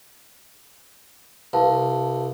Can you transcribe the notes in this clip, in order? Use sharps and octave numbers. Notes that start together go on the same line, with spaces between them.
C2 B4 F5 A5